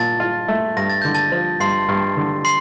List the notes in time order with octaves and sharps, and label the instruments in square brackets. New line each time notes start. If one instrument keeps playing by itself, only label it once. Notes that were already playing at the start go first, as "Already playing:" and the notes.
Already playing: [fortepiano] A#2 [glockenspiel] A5 A6
[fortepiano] F4
A3
[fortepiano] G2 [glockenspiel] A#6
[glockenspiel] A6
[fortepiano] D3 [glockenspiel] G6
[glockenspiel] A5 A6
[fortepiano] F3
[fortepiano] G2 [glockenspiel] C6 C7
[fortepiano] G2
D3
[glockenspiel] C6 C7